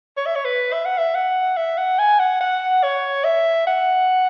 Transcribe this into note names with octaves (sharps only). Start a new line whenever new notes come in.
C#5
E5
C#5
B4
E5
F#5
E5
F#5
E5
F#5
G#5
F#5
F#5
C#5
E5
F#5